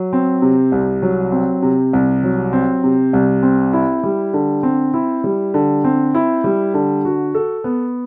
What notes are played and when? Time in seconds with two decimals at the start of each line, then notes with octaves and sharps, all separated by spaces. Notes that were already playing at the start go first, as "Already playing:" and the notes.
Already playing: F#3
0.13 C4
0.42 C3
0.72 C2
1.02 F#3
1.32 C4
1.62 C3
1.93 C2
2.23 F#3
2.53 C4
2.84 C3
3.13 C2
3.43 C4
3.73 E4
4.03 G3
4.33 D3
4.63 C4
4.94 E4
5.24 G3
5.54 D3
5.84 C4
6.14 E4
6.44 G3
6.74 D3
7.05 F#4
7.34 A4
7.64 B3